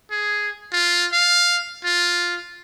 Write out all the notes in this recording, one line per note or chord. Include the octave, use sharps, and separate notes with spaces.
G#4
F4
F5
F4